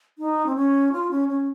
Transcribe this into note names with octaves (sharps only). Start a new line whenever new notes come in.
D#4
C4
C#4
F4
C#4
C#4